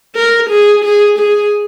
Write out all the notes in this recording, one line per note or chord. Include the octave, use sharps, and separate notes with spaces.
A#4
G#4
G#4
G#4